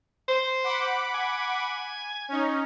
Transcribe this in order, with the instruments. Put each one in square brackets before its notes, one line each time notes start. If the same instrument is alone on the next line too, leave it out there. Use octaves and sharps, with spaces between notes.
[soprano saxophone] C5
[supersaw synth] F#5 B5 D6
[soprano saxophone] G#5
[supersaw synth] C#4 D#4